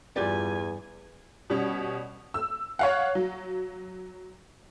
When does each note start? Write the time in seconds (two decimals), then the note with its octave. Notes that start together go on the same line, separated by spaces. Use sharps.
0.16 E2 G2 F4 G4 D5 G#5
1.50 B2 G3 C#4
2.34 E6
2.79 C#5 F5 F#5
3.15 F#3